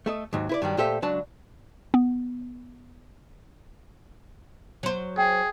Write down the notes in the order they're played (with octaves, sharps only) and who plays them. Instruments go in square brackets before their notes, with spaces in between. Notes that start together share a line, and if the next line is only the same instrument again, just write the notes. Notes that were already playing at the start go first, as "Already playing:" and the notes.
[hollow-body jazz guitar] A3 A4 D#5
D#2 G#2 F#3
E4 B4 D5
G2 D#3 F#3 G3
A#2 A3 G4 A4 C5 E5
C#2 F#3 D4 A5
[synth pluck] B3
[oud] F#3 C5
[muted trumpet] G#4 [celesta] G5